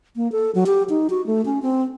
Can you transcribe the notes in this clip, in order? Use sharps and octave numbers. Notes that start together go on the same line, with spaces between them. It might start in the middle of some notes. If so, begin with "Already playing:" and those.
A#3
A4
F#3
G4
D#4
F#4
A3
C#4
C4